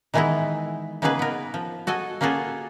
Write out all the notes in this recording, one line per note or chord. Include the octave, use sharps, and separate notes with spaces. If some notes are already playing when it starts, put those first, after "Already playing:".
D#3 E3 G#3 B3 D#4 E4
C#3 A#3 B3 D#4 G#4 B4
B3 A#4
F3
F#4 A4 D#5 G#5
A#3 C#4 F4 F#4 G#4 A4